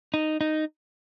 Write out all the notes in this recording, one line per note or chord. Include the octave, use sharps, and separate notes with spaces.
D#4
D#4